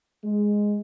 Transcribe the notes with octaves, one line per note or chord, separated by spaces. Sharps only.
G#3